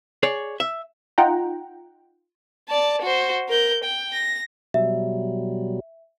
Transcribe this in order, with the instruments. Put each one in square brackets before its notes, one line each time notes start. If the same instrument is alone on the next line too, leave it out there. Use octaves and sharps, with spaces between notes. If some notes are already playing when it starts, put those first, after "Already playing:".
[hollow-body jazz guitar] G#4 C#5 D5
E5
[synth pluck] D#4 F4 F#5 G5 A#5
[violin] D5 A5
F#4 C5
A#4 G6
G5
A#6
[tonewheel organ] B2 F#3 G3 [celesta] E5